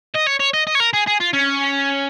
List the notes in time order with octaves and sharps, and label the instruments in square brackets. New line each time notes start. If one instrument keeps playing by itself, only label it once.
[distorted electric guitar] D#5
C#5
C#5
D#5
D#5
C#5
A#4
G#4
G#4
F4
C#4